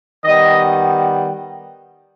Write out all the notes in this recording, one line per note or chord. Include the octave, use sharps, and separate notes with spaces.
D#3 G3 B3 D#5